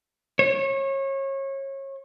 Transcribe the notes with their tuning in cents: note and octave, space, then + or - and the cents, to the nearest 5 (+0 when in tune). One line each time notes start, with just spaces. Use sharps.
C#5 -30